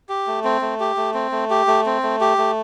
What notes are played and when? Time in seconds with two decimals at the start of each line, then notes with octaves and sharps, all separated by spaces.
0.09 G4
0.27 A3
0.44 C4
0.61 A3
0.80 G4
0.97 A3
1.14 C4
1.32 A3
1.50 G4
1.67 A3
1.86 C4
2.03 A3
2.21 G4
2.38 A3